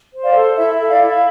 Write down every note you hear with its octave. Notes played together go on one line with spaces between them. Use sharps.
C5
D5 F5
A4
E4 E5
A4 E5
D5 F5
E4
F5